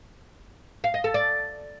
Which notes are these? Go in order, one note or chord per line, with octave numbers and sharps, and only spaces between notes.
F5
D#5
A4
D5